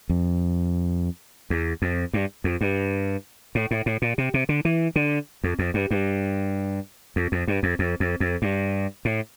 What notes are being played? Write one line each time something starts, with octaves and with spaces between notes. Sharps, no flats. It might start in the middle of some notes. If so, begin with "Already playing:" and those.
F2
E2
F2
G2
F2
G2
A2
A2
A2
A#2
C3
C3
D3
E3
D3
F2
F2
G2
G2
F2
F2
G2
F2
F2
F2
F2
G2
A2